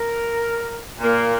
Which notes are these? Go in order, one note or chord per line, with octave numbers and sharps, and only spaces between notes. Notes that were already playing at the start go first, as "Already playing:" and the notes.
Already playing: A#4
A#2 A#3